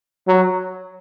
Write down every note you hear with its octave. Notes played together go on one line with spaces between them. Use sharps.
F#3